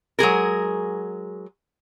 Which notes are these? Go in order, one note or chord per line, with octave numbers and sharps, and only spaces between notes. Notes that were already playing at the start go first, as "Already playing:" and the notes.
F#3 G#3 G#4 A#4